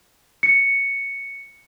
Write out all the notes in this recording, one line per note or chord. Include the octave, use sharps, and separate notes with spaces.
C#7